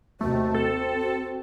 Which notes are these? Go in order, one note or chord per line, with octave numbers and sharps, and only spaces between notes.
D#2 C3 A3 F#4
C4 A4
F#4